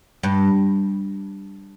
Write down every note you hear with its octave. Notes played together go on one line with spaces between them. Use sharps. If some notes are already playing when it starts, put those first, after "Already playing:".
G2